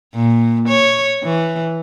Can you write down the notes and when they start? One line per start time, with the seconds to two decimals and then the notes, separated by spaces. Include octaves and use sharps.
0.15 A#2
0.68 C#5
1.24 E3